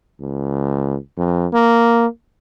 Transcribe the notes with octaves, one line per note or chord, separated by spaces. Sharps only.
C#2
F2
A#3